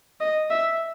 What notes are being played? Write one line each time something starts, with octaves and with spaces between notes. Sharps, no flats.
D#5
E5